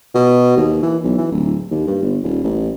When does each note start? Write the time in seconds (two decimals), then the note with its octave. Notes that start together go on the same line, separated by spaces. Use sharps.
0.15 B2
0.57 D#2
0.83 E3
1.03 B1
1.18 E3
1.32 D1
1.71 D#2
1.87 G2
2.02 G1
2.23 D#1
2.44 A1